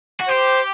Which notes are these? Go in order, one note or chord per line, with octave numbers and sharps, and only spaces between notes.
F#4
G4 C5